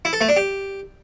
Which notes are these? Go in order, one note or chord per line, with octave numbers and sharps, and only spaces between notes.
E4
A4
A3
D4
G4